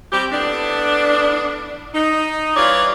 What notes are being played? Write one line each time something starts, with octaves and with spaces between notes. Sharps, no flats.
C4 G4
A2 B3 D4
D#4
E3 G3 F4 C#5 D5